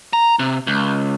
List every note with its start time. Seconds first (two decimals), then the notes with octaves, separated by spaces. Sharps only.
0.13 A#5
0.39 C3
0.67 C#2